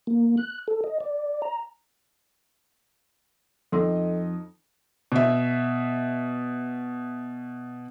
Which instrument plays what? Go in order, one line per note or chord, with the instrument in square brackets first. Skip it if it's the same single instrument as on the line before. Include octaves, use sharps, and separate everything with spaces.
[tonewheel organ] A#3
F#6
A4
D#5
D5
A#5
[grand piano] F2 D#4 D#5 [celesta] A4 C6 E6
[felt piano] B2 E5